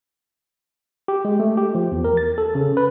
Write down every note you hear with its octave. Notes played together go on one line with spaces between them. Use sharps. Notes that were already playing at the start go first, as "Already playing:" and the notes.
G4
G#3
A3
G4
F3
E2
A#4
A6
A4
C#3
B4